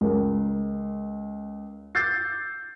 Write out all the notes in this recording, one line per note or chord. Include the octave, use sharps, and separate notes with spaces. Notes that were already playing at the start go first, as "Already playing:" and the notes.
C#2 A#4
D6 E6 G6 A6 C7